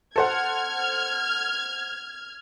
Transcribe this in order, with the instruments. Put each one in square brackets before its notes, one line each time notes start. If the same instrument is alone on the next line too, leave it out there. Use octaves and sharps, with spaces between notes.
[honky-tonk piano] A4 C5 F#5 [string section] F6 G#6